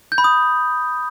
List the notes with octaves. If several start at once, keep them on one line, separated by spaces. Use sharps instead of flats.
G6
B5
D#6